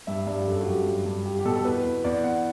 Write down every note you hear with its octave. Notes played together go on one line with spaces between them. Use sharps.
G2 E5
G2 D5
G4
F#2 A4
F#4
F#2 G4
G2
G2
G3 G4
G4
B2 A4
A4
E2 B4
E2
E2 D5
E2 F#5